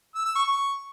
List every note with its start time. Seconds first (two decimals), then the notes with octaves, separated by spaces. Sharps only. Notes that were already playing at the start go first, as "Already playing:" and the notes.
0.15 E6
0.25 E6
0.35 C#6
0.46 C#6